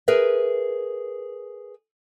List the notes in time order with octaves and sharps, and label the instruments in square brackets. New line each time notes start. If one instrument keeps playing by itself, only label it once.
[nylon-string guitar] G#4 A#4 B4 E5